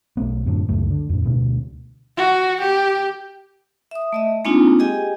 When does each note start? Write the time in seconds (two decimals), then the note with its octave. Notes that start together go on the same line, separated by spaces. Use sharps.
0.17 B1 A3 B3
0.46 F#2 A2 D3
0.69 C#2 F#2 A3
0.90 D3
1.09 F2 A2
1.25 D2 B2
2.17 F#4
2.61 G4
3.91 E5 D#6
4.13 A3 D#5 E5
4.45 G#3 A#3 C4 D4 D#4 F4
4.79 G4 G#4 D#5 G5 G#5